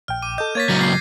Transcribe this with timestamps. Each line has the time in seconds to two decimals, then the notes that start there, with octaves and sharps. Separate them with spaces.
0.08 A#1 G5 F6
0.22 D6 D#7
0.38 A4 D#5 G6
0.55 A#3 C#5 G#6 A6 B6
0.69 C#2 F#3 A6 A#6 D#7
0.81 C7